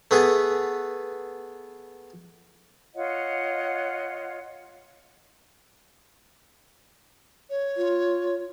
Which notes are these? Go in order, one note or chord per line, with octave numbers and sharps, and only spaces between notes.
A3 B3 G#4
F4 C#5 D#5 F#5
C#5
F4